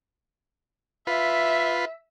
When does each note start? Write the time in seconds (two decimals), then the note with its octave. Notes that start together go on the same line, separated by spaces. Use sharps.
1.07 F4 B4 E5